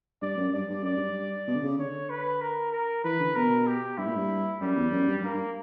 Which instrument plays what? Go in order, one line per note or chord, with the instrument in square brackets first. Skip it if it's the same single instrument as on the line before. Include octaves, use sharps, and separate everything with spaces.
[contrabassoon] G2 [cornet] D5
[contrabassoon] F#2
[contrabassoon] G2 [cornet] D5
[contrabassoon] G2
[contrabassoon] F#2 [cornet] D5
[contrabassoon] G2
B2
D3
C#3
[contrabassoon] D3 [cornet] C#5
[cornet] B4
A#4
A#4
[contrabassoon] E3 [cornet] B4
[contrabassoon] D3
[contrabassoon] B2 [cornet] A#4
[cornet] G4
[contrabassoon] G2 [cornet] E4
[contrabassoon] A#2
G2
[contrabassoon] F#2 [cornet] G3
[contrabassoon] E2
F#2
G2
[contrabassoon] G2 [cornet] A#3
[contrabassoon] G2